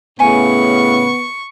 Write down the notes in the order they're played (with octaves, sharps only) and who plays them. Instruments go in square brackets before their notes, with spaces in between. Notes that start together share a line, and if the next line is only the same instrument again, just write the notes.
[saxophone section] A2 C#3 [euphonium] B3 [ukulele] G#5 [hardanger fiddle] C#6